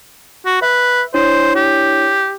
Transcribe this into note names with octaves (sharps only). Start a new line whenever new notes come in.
F#4
B4 E5
D4 E4 C5 C#5
G4